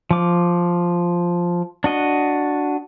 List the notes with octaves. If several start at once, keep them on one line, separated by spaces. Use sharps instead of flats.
F3 D6
D4 F#4 D#5